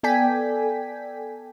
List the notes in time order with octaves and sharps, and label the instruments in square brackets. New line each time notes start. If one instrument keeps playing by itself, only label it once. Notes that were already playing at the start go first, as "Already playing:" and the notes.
[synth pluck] B3 A4 D5 G5 G#5 B6